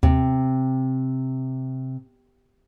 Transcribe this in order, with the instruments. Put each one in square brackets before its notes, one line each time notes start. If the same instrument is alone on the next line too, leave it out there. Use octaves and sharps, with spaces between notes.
[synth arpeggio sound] D#2 [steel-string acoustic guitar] C3